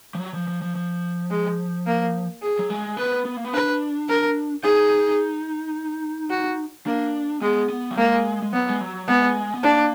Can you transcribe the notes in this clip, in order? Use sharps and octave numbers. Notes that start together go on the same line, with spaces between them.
F3
F#3
F3
F3
F3
F3
G#3
A#3
G#4
F#3
G#3
B3 B4
B3
A#3
B3
D4 B4
A#4
D#4 G#4
F#4
A#3 D4
G#3 B3
B3
F#3
G#3 A#3
G#3
F#3 B3
G#3
F#3
G#3 B3
B3
A#3 D4